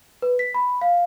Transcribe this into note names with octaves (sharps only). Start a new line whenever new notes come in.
B4
B6
B5
F5